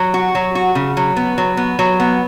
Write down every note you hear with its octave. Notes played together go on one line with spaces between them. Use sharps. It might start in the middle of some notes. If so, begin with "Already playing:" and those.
Already playing: F#3
F#4
F#3
F#4
C#3
F#3
B3
F#3
B3
F#3
B3